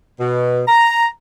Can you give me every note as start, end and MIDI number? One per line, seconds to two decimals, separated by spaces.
0.20 0.62 47
0.68 1.07 82